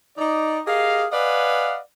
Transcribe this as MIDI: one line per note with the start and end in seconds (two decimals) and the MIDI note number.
0.18 0.58 63
0.18 0.58 74
0.18 0.58 75
0.66 1.05 67
0.66 1.05 68
0.66 1.05 70
0.66 1.05 75
0.66 1.05 77
1.12 1.78 71
1.12 1.78 74
1.12 1.78 75
1.12 1.78 77
1.12 1.78 78
1.12 1.78 80